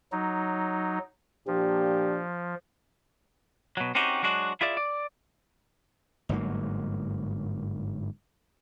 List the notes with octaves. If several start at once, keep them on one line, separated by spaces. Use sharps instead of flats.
F#3 D#4
A#2 F3 D4 G4
B2 F#3
C4 C#4 D#4 F#4 G4
F#3 G#3 D4 F#4
E4 F4 G#4 D5 E5
D5
G1 G#2 F#3 A#3